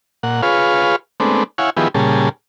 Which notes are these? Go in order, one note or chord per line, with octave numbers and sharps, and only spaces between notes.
A#2 F#5
F4 G#4 B4 C#5 F5
G#3 A3 B3 C4 D4
E4 C#5 F5 F#5 G#5
D#3 F3 B3 E4 G4 G#4
A#2 C#3 G3 G#4 A5